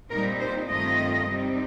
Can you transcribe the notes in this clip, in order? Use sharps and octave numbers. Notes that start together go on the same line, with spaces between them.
A#2 G3 C4 D#4 A#4
C5
G2 D#3 A3 C4 F4 D#5
C3 G3 C4 D#4